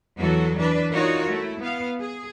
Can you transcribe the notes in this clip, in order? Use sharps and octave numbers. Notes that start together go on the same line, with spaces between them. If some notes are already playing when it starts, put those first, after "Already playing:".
E2 E3 F#3 F#4 A4
E3 D4 B4
D#4 F4 F#4 A#4 C#5
A3 E4
B3 F5
G#4